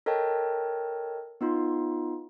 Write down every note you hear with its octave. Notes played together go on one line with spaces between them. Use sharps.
A4 A#4 C#5 D#5 G5 A5
B3 D#4 F4 C6